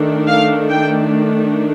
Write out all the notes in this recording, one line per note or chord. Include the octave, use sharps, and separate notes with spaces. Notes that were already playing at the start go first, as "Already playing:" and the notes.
Already playing: D#3 A3 D4
F5
G5